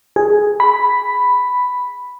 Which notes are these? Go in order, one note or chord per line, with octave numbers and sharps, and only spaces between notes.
G#4
B5